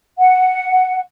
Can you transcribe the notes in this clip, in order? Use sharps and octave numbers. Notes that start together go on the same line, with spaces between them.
F#5